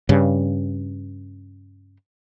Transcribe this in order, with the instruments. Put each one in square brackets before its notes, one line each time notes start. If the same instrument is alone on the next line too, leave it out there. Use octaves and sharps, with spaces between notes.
[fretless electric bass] G2 C#3